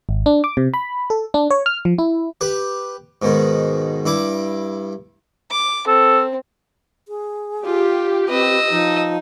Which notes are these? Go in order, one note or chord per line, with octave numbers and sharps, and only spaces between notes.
G#1
D4
D6
C3
B5
A4
D4
C#5
F6
F3
E4
G4 B4
G#2 B2 D#3
G2 E4 D6
D6
C4 A4
G#4
F4 G4
C4 B4 D#5 E6
F3 D#4